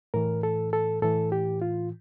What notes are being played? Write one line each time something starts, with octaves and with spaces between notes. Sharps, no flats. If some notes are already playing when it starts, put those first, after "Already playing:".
A2 E3 A#4
A4
A4
A2 E3 A4
G4
F4